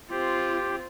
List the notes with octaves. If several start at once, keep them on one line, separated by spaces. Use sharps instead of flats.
C4 F4 G4